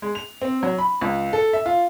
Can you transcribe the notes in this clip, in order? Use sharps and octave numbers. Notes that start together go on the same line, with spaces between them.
G#3
F7
C4
F#3
B5
C#2
A4
E5
F4